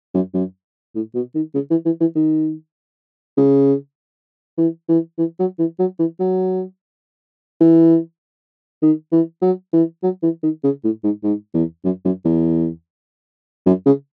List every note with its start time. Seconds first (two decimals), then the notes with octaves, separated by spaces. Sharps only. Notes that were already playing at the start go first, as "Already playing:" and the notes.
0.14 F#2
0.34 F#2
0.95 A2
1.15 B2
1.35 D#3
1.55 C#3
1.70 E3
1.85 E3
2.00 E3
2.15 D#3
3.37 C#3
4.58 E3
4.89 E3
5.18 E3
5.39 F#3
5.59 E3
5.79 F#3
5.99 E3
6.20 F#3
7.60 E3
8.82 D#3
9.12 E3
9.42 F#3
9.73 E3
10.03 F#3
10.23 E3
10.43 D#3
10.64 C#3
10.84 A2
11.04 G#2
11.23 G#2
11.54 E2
11.84 F#2
12.05 F#2
12.25 E2
13.66 F#2
13.86 C#3